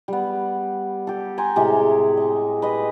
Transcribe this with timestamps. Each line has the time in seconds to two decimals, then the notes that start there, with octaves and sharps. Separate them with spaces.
0.08 G3 B3
1.07 G4 A4
1.38 G5 G#5 A#5 C6
1.56 A2 C3 G#3 G4
2.17 D#5 C#6
2.62 B4 D#5